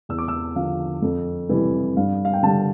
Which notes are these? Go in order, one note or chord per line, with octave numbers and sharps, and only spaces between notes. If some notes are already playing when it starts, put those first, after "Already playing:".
E2 E6
D6
E6
D3 F3 F5
F2
C3 E3 G3
G2 F5
F5
G5
D3 G3 A5